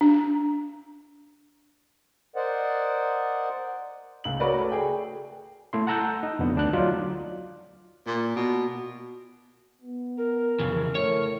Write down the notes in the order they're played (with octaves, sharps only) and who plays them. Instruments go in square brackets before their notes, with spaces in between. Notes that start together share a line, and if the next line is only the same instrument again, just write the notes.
[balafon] D4
[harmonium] A#4 C5 D5 D#5 F#5
[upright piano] C#2 F#7
F#4 A#4 B4 C#5 D5
A3
G#4 G5
[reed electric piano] A3 E4 C6
F#5 A5 A#5 E6 F#6 G6
D#4
F2 D3 B3
D2 D4 F#6
F#3 D#4 F4 D5
[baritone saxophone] A#2
B2
[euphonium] B3
[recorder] A#4
[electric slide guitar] F2 C#3 E3
[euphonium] A2 [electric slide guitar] C#5